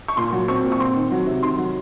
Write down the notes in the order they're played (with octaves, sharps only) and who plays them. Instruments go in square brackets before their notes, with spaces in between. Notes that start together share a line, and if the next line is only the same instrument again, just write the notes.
[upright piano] C#6
A#2 C6
F#3
C4 C#6
A#2
C#6
C4 C6
D#3
F#3
C3
D#3 C6
F#3